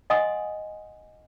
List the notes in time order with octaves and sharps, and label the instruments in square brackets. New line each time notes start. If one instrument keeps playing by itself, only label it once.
[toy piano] D#5 F#5 G#5 C6 D#6